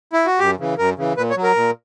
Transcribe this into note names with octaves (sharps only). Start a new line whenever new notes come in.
E4
F#4
F#2 G4
C#3 E3
F#2 A#4
C#3 E3
A#2 B4
C#5
F#3
A#4
A#2